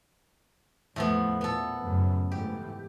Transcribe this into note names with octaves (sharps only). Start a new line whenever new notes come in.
E2 A2 F3 A3 B3
A#2 B3 A4
F#2 A2 C#3
G#2 E3 A3 G4